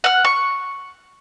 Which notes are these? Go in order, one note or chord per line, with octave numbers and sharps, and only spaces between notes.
F#5 F6
C#6